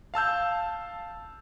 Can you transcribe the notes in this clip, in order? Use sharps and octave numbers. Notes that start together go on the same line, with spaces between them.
F5 A5 E6 G6